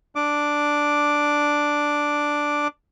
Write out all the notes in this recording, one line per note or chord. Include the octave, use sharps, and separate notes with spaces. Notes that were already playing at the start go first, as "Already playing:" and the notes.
D4 D6